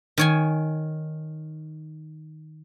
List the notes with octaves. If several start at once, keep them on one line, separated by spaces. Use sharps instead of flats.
D#3 C#5 G#5